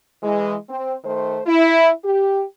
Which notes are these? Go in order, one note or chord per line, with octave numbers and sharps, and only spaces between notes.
E3 G#3
C4
D#3 A3 C5
E4
G4